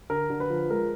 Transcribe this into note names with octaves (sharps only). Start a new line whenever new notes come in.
D3 A#4
D3
B4
F3
G#3 A#4